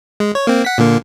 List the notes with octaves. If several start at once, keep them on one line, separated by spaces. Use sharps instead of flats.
G#3
C#5
A#3 C4
F#5 B6
A#2 D3 A#3